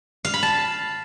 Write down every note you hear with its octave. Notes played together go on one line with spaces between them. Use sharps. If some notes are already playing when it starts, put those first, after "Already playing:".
F5
B5
A5